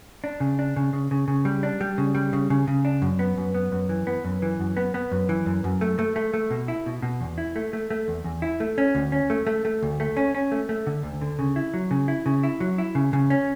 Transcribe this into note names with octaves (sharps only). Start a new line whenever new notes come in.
D4
C#3
D4
C#3
C#3
C#3
C#3
G3
D4
G3
C#3
G3
C#3
C#3
C#3
D4
F#2
B3
F#2
B3
F#2
E3
B3
F#2
E3
F#2
B3
B3
F#2
E3
F#2
F#2
A3
A3
A3
A3
B2
E4
B2
B2
E2
E4
A3
A3
A3
E2
E2
E4
A3
C#4
D2
C#4
A3
A3
A3
D2
A3
C#4
C#4
A3
A3
D3
D2
D3
C#3
E4
F#3
C#3
E4
C#3
E4
F#3
E4
C#3
C#3
C#4